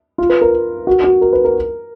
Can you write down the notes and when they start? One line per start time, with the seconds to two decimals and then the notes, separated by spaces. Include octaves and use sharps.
0.18 F4
0.29 B4
0.41 A#4
0.87 F#4
1.04 F#4
1.21 A#4
1.33 B4
1.44 A#4